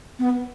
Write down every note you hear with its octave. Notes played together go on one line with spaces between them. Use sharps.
B3